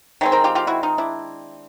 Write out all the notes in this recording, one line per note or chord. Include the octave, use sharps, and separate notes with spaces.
D#3 G#3 C4 C#5
A#4 C5
F4 G4
F4 G4
E4 F#4
D#4 F4
D4 E4